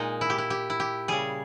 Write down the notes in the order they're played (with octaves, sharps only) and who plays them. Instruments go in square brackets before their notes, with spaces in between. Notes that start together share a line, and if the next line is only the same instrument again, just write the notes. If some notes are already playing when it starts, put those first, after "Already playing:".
Already playing: [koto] A#2 G#3 D#4
E4
G4
E4
G4
E4
G4
C#3 G3 G#4